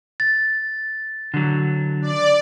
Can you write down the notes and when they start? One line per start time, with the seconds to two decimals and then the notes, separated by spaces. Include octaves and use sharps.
0.20 A6
1.34 D3 F#3
2.02 D5